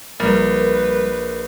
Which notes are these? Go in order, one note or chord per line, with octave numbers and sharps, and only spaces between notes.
A#1 G3 A#4 B4